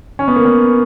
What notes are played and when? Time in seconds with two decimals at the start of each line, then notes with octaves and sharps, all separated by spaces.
0.19 C#4
0.28 B3
0.36 A#3
0.45 B3